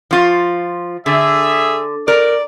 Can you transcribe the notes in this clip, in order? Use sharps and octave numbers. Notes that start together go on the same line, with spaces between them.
F3 F4
D3 G#4 E5
A#4 D5